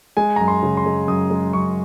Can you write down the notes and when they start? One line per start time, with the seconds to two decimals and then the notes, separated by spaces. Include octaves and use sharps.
0.17 G#3 G#5
0.36 F#2 A#5
0.48 C6
0.63 C#3
0.77 C6
0.86 G#3
1.08 F#2 D#6
1.30 G#3
1.53 F#2 C#6